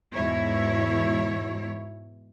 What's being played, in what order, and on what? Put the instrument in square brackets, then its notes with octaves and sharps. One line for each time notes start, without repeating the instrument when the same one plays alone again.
[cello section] E2 G#2 B2 E4 C#5